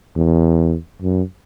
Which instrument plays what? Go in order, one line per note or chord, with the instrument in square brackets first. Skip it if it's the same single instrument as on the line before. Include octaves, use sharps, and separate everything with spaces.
[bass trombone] E2
F#2